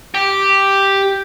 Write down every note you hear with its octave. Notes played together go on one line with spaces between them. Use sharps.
G4